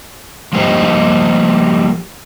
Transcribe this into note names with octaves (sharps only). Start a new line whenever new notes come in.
F3 G3 A#3 G4 C5 D#5